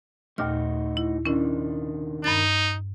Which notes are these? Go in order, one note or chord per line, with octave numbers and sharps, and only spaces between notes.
D#2 A#2 A3 D#4 F#4 F6
E4
C3 D#3 C#4 D4 E4
G2 D#4 A#5 A6